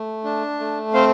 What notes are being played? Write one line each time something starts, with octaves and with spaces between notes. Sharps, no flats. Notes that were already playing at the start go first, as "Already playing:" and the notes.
Already playing: A3
D4
A3
C4 C5 F5